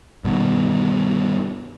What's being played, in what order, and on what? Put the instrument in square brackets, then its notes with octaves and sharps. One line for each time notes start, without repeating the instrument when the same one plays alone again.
[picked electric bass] G2 B2 D#3